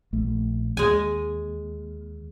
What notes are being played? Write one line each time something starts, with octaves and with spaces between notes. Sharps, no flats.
A#1 A3
D#2 G#3 G#5